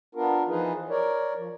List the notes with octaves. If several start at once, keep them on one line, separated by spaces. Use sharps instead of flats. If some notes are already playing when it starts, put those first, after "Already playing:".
B3 D4 F4 A#4
E3 F3 D#4 F4 G#4 B4
A#4 C#5 D5
F3